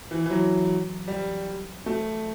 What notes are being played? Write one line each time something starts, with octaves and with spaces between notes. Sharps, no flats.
E3
E3
F#3
G3
A3